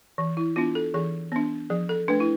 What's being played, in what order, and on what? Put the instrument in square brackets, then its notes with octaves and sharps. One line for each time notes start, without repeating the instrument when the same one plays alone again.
[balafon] E3
E4
B3 D4 F4
A4
E3 G#4
B3 D4
F3 G#4
A4
A3 D4 B4
E4